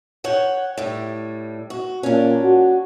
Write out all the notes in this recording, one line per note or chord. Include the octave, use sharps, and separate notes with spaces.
C#5 F#5 G5
A2 G3
F#4
A#2 C#4 D4
F#4